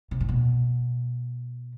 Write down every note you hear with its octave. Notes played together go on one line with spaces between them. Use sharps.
C3
A2
B2